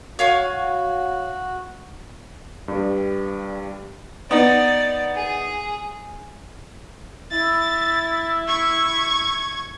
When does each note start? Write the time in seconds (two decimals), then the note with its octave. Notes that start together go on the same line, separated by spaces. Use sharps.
0.19 F#4 C#5 F5 G#5
2.68 G2 G3
4.31 B3 D#4 D5
5.15 G#4
7.31 E4 A6
8.47 C#6 G#6